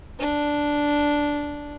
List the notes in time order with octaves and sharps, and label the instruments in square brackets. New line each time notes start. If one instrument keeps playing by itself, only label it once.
[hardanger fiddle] D4